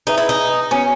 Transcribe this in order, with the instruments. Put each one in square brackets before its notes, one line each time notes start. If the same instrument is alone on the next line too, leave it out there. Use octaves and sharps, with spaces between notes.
[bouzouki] D#4 [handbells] G#4 B4 E5 G#5
[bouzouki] E4
D#4
[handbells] B3 F#4 C#5 G#5 [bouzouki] C#4